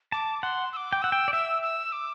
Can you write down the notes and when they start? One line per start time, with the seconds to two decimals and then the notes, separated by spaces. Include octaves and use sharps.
0.12 A5 D6
0.42 F#5 C6
0.73 E6
0.77 D6
0.93 G5
1.02 F#5 E6
1.12 G5
1.28 D5
1.33 E5 E6
1.62 E6
1.92 D6